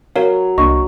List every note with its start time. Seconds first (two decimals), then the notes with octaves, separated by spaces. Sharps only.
0.16 F#3 A#4 C#5 F5
0.58 C2 A#3 D4 D#5 C#6